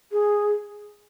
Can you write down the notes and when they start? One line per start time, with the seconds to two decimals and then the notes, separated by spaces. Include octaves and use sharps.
0.12 G#4